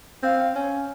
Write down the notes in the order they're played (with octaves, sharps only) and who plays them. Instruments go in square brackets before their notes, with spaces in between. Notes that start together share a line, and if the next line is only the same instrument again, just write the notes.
[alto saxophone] C4 [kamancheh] F5
[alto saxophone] C#4